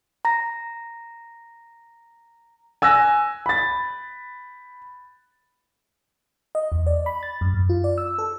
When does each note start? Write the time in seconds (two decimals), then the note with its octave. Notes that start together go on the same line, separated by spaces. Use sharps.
0.25 A#5 A#6
2.82 G#5 E6 F#6 A#6
3.46 B5 A6
6.55 D#5
6.72 E2
6.87 D5
7.06 B5
7.23 A6
7.41 F#2
7.54 F#2
7.69 F4
7.84 D5
7.98 E6
8.19 A4